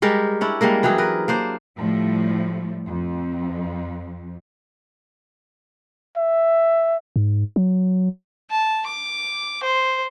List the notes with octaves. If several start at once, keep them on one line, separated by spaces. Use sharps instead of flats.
G3 G#3 G4 A#4
C#4 D4 E4
G3 G#3 A#3 A#4
E3 F#3 G4 G#4
A#4 B4
A#3 D4 C5
A2 F3 G3
F2
E5
G#2
F#3
A5
D6
C5